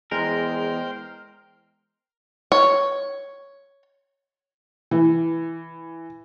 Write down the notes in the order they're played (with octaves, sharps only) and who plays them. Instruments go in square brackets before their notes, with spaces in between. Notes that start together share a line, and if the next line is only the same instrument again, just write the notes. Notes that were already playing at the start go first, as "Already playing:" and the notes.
[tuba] E2 [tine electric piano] G#3 [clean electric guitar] A#4 [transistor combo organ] C5 G5
[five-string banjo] C#5
[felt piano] E3